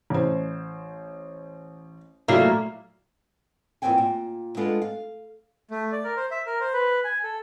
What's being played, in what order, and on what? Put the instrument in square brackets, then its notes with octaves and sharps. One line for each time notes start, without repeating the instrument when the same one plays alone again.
[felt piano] A1 C5
[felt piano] A#2 F#3 A3 [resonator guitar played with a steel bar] A#3 E4 D5
[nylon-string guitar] E2 A#2 B3 C4 G5 G#5
A#2
G#3 B3 D4 F4 A4
F5
[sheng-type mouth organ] A3
D5
A#4
C5
E5
A#4
C5
B4
G#5
A4